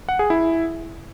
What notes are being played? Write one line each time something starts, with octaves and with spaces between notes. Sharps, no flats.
F#5
G#4
E4